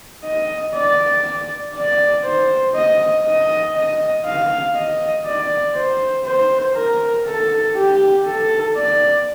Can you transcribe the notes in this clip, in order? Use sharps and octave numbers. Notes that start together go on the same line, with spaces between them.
D#5
D5
D5
C5
D#5
D#5
D#5
F5
D#5
D5
C5
C5
A#4
A4
G4
A4
D5